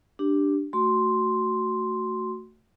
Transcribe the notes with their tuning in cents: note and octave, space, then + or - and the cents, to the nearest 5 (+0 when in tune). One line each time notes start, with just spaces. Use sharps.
D4 +0 G4 +0
A3 +20 F#4 +0 C6 +0